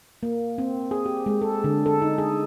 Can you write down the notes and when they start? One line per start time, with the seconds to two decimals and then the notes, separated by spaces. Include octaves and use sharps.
0.23 A#3
0.58 C4
0.91 G#4
1.06 G4
1.26 G#3
1.42 A4
1.64 D3
1.86 A4
2.02 D#4
2.18 G#4